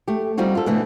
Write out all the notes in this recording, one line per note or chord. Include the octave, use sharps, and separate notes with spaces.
A3 G4
G3 C4 D#4 F4 F#4
F4 A4
B2 D3 E3 A3